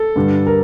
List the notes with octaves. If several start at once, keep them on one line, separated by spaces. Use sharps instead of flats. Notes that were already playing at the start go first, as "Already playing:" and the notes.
Already playing: A4
G2 D3 G3 D4
A#4